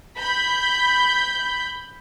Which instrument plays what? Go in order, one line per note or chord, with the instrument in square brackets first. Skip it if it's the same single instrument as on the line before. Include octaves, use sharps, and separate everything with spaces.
[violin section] B5 G6